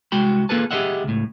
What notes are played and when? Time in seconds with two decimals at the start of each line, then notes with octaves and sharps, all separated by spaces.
0.12 C2 G#3 F#4 G5 B5
0.49 A#3 F4 G#4 A4 B4 A5
0.71 G4 G#4 C5 D#5 E5 F#5
1.04 C#2 A2